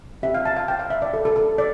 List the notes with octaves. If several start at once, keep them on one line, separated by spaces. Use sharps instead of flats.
C4 G4 E5
F5
A5
F5
G5
F5
E5
D5
A4
A4
A4
D5